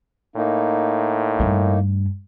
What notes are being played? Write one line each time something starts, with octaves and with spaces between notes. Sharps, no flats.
A2 A#3 D#4
G2 A3